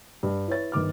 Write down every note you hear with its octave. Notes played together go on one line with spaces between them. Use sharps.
G2
E4 B4 C#5 A6
G1 D#3 D6 F6